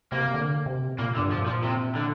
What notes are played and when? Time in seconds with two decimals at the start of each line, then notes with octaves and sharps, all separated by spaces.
0.12 C3 A#3
0.34 D3
0.66 C3
0.98 A#2 A#3
1.15 D3
1.19 G2
1.31 F3
1.41 A#2
1.46 F3
1.63 C3
1.95 D3